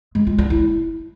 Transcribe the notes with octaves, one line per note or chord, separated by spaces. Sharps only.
G#3
F4
D4
E4